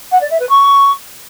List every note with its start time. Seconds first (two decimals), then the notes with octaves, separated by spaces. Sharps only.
0.12 F#5
0.21 D5
0.30 E5
0.40 B4
0.49 C#6